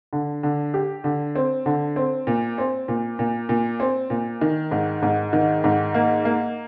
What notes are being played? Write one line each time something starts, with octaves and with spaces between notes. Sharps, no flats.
D3
D3
G4
D3
C4
D3
C4
A#2
C4
A#2
A#2
A#2
C4
A#2
D#3
G#2
G#2
D#3
G#2
A#3
A#3